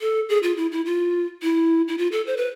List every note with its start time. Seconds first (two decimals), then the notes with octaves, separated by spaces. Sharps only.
0.01 A4
0.29 G#4
0.43 F4
0.57 E4
0.72 E4
0.86 F4
1.42 E4
1.88 E4
1.98 F4
2.12 A4
2.27 C5
2.37 B4